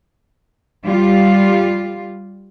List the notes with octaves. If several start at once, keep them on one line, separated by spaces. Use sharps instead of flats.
G3 F4